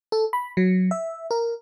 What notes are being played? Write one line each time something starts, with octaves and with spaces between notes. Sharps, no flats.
A4
B5
F#3
E5
A#4